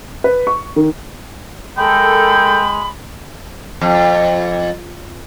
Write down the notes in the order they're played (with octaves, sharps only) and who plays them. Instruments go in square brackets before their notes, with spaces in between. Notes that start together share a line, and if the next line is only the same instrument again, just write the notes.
[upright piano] B4
C#6
D#3
[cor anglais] G#3 [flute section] A4 A#4 [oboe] G5 [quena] B5
[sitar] F2